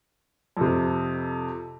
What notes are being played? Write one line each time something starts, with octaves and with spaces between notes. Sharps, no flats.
F2 C3